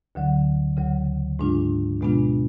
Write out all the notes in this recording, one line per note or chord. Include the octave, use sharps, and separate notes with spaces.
D2 D3 F#3
D2 C#3 F#3
G#2 G#3 D4 F4
B2 G#3 B3 D4 F4